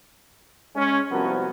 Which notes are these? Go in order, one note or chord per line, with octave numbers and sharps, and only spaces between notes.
G#3 C#4
C2 F3 B3 F#4 A#4